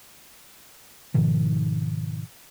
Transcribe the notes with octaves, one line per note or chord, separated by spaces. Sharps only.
G#2 B2 D#3 F3